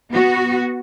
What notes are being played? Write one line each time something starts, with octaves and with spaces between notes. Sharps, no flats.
B3 F#4